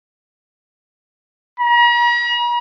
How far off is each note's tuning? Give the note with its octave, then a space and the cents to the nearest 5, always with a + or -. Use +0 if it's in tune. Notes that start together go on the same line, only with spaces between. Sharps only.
A#5 +45